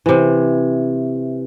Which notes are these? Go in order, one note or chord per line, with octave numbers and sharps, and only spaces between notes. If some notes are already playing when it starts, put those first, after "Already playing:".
C3 E3